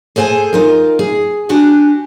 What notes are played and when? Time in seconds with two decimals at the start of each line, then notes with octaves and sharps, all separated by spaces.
0.16 G#4 A4 C5 G5 G#5
0.53 D#4 F4 A#4
0.99 G#4
1.49 D4 F#4 G4 G#5